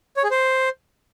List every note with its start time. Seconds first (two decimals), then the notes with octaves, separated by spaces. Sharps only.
0.17 C#5
0.24 G#4
0.31 C5